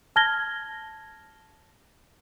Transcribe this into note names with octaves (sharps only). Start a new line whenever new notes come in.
A5 F6 G#6 A#6 G7